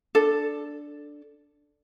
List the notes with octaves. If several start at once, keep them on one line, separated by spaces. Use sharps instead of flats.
D4 A4